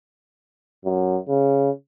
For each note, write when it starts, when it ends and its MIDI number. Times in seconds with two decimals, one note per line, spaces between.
0.85 1.18 42
1.28 1.70 49